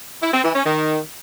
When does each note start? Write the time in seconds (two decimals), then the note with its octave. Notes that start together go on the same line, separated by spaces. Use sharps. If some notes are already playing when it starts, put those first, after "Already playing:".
0.23 E4
0.33 C4
0.44 E3
0.55 C#4
0.66 D#3